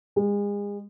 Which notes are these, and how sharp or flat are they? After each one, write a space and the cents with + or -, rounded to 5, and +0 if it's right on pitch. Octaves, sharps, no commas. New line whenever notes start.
G#3 -35